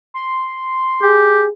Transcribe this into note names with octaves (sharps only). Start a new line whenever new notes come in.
C6
G4 G#4